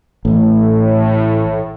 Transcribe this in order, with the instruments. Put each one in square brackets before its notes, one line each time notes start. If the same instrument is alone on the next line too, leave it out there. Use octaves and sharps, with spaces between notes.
[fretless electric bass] A1 [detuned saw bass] A2